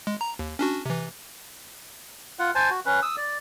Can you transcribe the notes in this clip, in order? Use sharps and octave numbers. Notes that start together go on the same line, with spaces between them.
G#3
A#5
D#2
C#4 D4 F#4
C3 E3
F4 F#5
C5 G#5 A5
F#4
C#4 B4
D#6 E6
D5